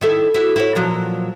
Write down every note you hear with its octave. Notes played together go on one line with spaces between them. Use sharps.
D#3 E4 A4
E4 F#4
E4 F#4 C#5
A#2 F3 F#3